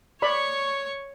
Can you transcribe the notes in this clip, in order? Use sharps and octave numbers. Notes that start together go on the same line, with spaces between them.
C#5 D5 B5 C#6